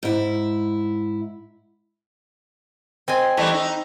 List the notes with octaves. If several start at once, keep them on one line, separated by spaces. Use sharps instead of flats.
G#2 E4
C4 D#5 G#5
E3 G3 A3 D#5 G5
D#4